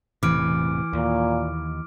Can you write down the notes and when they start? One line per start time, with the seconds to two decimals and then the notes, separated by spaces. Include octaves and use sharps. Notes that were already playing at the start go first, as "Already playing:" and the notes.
0.23 E1 A2 C3 E3 D6 F6 D7
0.93 D#2 A#2